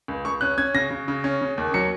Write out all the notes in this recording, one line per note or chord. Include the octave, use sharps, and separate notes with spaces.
C#2
C#2 C#6
C#4 F#6
C#4 G#6
C#3 A#6
C#3
C#3
C#4
C#3
D#2
F#3 C#7